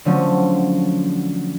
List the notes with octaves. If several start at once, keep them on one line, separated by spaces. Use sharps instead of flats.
D3 F3 F#3 A3 C#4